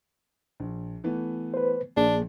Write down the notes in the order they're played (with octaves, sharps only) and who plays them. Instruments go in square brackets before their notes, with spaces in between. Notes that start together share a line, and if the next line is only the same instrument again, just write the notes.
[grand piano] A#1
E3 A3 B3
[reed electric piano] B4 C5
[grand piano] A#1 [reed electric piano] A#3 G#4 [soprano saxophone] D4